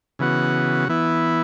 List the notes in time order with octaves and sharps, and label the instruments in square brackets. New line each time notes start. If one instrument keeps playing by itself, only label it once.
[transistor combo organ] C#3 E3 B3 F#4
E3 B3 E4